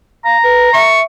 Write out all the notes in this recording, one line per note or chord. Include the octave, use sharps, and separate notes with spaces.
F5 A#5
B4
E5 C#6